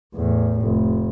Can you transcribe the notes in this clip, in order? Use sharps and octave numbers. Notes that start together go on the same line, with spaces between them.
E2 A2
F1